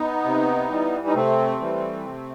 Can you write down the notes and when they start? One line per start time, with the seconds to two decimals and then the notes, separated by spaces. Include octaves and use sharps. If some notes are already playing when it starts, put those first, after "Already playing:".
Already playing: B3 D#4
0.24 C3
0.70 E3 G3
1.07 D#4
1.14 C3 A3 C4
1.60 E3 G3
2.06 C3